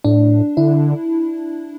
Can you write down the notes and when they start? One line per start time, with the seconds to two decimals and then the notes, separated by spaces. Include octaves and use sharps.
0.05 A2 D4
0.57 D3 E4